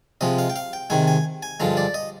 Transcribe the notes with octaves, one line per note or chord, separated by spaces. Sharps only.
C3 F3 G#3 D#5
F5
G5
F5
G5
C3 D#3 G#3 G#5
G#5
G#5
G2 D3 F3 G#3 A#5
D5
D#5